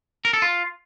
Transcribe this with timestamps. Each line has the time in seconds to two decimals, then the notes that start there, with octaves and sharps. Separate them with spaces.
0.25 A#4
0.33 A4
0.42 F4